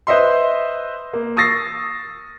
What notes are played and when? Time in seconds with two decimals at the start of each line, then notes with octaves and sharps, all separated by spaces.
0.07 B4 C5 D#5 E5 C6
1.13 A#3
1.37 C#6 D#6 E6 A6 A#6 C7